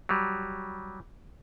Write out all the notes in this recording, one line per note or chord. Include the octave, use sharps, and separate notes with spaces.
F#3 G3